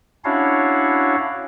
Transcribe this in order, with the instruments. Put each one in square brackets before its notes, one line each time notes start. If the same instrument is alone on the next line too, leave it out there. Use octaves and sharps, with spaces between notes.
[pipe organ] C#4 D4 E4 F#4 C#5 F5